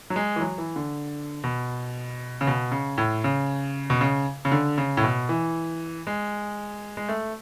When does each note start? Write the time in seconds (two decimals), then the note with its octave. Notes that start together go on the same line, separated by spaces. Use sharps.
0.10 F#3
0.16 G#3
0.36 E3
0.41 F#3
0.58 E3
0.76 D3
1.44 B2
2.41 C#3
2.47 B2
2.72 C#3
2.98 A2
3.24 C#3
3.90 B2
4.01 C#3
4.45 C#3
4.52 D3
4.78 C#3
4.97 A2
5.04 B2
5.29 E3
6.07 G#3
6.97 G#3
7.09 A3